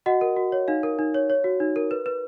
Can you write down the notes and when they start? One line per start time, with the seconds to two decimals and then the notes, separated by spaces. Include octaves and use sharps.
0.06 F#4 D#5 F#5
0.21 A#4
0.36 F#4
0.52 C#5
0.68 D#4 F5
0.83 A#4
0.99 D#4
1.14 C#5
1.30 C#5
1.44 F#4
1.60 D#4
1.76 A#4
1.91 B4
2.06 B4